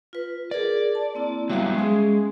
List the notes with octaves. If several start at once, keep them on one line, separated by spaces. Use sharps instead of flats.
F4 B4
G#4 A#4 D5
A5
A#3 C4 E4
F#3 G3 B3 E5 F5
G#3 C#4 G#4